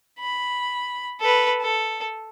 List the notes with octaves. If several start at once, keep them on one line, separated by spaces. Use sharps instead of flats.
B5
A4 B4
A4